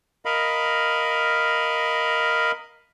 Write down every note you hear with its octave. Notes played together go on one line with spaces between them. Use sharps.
A#4 D#5 F5 B5